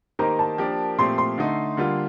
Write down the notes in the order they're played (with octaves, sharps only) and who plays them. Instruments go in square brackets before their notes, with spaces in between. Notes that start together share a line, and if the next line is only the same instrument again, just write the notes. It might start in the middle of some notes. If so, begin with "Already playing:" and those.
[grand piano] D#3 A#3 D#4 G4 C5 [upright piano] A#5
[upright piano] A5
[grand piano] F3 A#3 D4 G4 A#4
[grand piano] A#2 F3 A3 C4 G4 [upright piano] C6
[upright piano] C6
[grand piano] D3 A3 D#4
D3 G3 A#3 F4